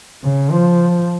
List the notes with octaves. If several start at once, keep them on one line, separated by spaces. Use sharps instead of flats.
C#3
F3